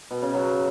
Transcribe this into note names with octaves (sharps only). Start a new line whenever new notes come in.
B2
C#3
F#3